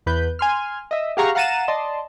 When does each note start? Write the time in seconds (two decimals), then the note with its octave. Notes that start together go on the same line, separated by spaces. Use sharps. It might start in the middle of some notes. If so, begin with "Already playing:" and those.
0.06 E2 B4 G6
0.39 G#5 C6 F6
0.91 D#5 E5
1.17 G4 G#4 F5 F#5 A#5 C#6
1.35 F5 F#5 A#5 A6 D#7 E7
1.68 D5 D#5 A5 C6